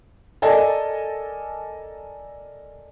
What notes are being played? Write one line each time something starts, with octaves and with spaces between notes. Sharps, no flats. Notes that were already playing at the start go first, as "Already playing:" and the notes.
A4 A#4 D5 D#5 G#5 A5